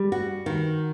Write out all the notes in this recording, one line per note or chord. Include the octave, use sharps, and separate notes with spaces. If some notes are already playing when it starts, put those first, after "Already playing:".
Already playing: G3
F#4
D#3